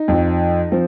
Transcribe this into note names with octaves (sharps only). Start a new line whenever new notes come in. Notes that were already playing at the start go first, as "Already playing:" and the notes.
Already playing: D#4
F2 F3
F3 C4